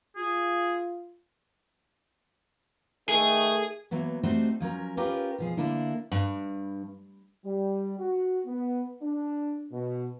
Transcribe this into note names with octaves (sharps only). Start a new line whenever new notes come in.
F4 G#4
D#3 A3 G#4
E3 F#3 A#3 B3
G3 A3 C4 D#4 F#4 C5
F3 F#3 C#4 A#4
C#4 F4 G4 A#4 B4
B2 F3 G#4
D3 A#3 D4 E4
G2
G3
F#4
B3
D4
B2